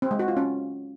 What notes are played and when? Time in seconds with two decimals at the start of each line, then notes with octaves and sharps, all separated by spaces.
0.02 C4
0.11 G#3
0.19 F#4
0.28 F4
0.37 C#4